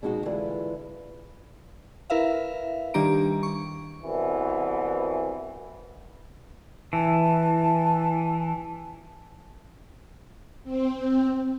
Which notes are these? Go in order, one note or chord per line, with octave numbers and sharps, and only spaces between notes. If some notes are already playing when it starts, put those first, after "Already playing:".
F2 B2 G#3 D#4 E4 F#4
D3 E3 G#3 E4 F4 B4
E4 A#4 B4 E5 F5
D#3 G3 D4 G4 A#5 D7
C#6
C2 B2 E3
E3 A5
C4